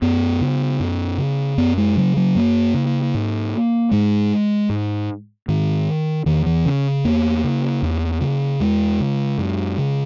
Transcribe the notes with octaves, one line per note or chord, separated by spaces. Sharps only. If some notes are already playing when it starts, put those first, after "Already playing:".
F#2 B3
C#3
F#2
C#3
F#2 B3
G#3
C#3 F#3
F#3
F#2 A#3
C#3
G#2
G#2 G#3
G#2
G#2 D#3
E2 D#3
E3
C#3 C#4
E2 A#3
C#3
E2
C#3
E2 G#3
C#3
F#2
C#3